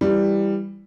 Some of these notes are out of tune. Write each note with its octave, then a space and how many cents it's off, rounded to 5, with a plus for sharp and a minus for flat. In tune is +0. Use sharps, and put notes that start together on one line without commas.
E3 +10 G3 +10